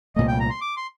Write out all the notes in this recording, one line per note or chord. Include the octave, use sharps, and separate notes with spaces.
C2 A#2 A3 D#5
G5
A#5
C6
D6
C6